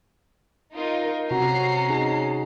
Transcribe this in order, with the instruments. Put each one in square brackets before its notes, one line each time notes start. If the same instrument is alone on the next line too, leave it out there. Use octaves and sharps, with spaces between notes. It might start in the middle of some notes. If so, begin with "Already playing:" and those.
[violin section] D#4 F4 A#4
[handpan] C3 F#4 [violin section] C#4 C7 [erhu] A#5
[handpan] D#4 G#4